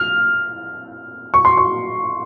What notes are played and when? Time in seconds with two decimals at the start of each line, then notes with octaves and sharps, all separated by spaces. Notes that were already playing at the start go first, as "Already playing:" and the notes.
Already playing: F6
1.34 C#6
1.45 C6
1.57 C#6